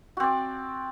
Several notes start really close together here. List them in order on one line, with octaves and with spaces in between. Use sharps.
F#4 C4 D5